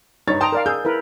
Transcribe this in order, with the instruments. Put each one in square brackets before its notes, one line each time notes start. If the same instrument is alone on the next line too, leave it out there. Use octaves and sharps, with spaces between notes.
[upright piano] G2 C#5 A6 [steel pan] D#4
[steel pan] G5 A#5 [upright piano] A5 C6 D#6
[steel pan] A#4 D5 F5
[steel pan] G#4 [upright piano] E6 G6
[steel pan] E4 A#4 B4